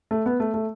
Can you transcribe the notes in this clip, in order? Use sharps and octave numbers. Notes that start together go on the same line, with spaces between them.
A3
B3
A3
A3